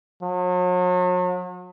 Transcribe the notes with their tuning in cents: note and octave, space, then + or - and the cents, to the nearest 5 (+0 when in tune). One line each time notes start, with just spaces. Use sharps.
F#3 -40